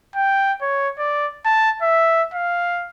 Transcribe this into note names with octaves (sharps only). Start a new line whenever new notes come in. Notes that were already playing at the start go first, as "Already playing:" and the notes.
G5
C#5
D5
A5
E5
F5